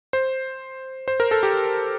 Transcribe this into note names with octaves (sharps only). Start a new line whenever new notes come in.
C5
C5
A#4
A4
G4